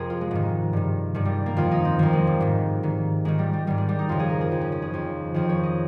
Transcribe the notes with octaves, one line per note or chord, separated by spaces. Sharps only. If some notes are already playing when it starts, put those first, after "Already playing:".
Already playing: F2 C3 G#4 A#4
F4
G#3
G#2 D#3
G2 D#3
G2 D#3 G#3
G3
A#3
F2 D#3 F4
D#4
C4
F2 D#3 A#3
G#3
G3
G#2 D#3
G#2 D#3
G#2 D#3 G#3
G3
G3
G#2 D#3 G3
G#3
G3
D#4
F2 C#3 F4
G#4
A#4
G#4
F2 C#3
C#4
C#4
G#4
F2 D#3
F2 D#3 G#4
C#5
D#5